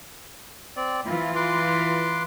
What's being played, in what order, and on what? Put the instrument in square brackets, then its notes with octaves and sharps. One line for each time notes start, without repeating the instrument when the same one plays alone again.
[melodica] C4 D5
[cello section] E3 F4 [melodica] E4
[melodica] B4 C6 D6